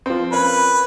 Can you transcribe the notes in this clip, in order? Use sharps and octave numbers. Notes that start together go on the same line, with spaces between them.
F3 C4
A#3 C#4 B4